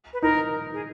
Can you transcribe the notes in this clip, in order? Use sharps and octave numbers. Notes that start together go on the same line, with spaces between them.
B4
D#4 A#4
G#4